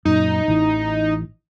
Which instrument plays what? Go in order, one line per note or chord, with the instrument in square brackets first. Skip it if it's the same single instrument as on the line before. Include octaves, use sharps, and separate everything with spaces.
[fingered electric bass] F#2 A#2 [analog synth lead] D#4
[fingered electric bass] A1 E3